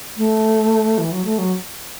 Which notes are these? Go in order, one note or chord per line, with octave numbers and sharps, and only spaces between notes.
A3
E3
F#3
A3
F#3